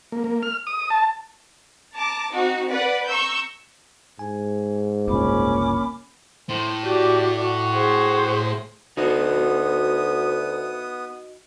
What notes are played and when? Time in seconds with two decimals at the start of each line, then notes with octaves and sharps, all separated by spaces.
0.12 A#3
0.24 A#3
0.43 F6
0.67 D#6
0.90 A5
1.94 A5 A#5 D6
2.32 C4 D#4 F#4
2.70 B4 D5 F#5
3.07 A#5 C#6 E6 G6
4.19 G#2 G#5
5.08 F#1 C2 A#2 A#3 C#4 B5 D6
6.49 A2 C5
6.85 F#4 G4 D5
7.44 F#4
7.73 G#4 C5
8.97 D2 B3 D#4 F#4 D#6